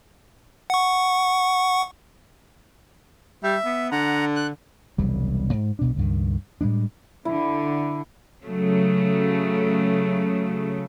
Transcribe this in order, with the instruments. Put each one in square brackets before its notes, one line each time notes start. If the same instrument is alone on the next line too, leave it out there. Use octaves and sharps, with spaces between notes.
[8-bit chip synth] F#5 C#6
[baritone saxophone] G3 [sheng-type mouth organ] E5
[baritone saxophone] B3
[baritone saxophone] D3 [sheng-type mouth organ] F#5 A#5
[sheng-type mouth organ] F#6
[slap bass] E1 C2 F#3 G3
G#2
B1 B2 D4
C#2 G2 D#3
A2 G3 G#3 D4
[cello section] D3 [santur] E4
[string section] C#3 F#3 A3